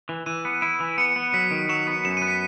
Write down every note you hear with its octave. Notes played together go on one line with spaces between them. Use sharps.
E3
E3 D#7
B3
E4
E3
B3 C#7
B3
F#3 B6
D#3
F#3 E7
B3
F#2 E7
D#7
B3
B6